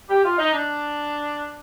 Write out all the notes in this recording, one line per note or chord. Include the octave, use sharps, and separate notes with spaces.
G4
F4
D#4
D4